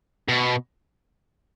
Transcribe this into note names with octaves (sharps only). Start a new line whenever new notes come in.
B2